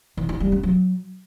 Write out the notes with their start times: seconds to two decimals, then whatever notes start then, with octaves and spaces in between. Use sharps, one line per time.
0.17 E3
0.29 E4
0.40 G3
0.52 C#4
0.63 F#3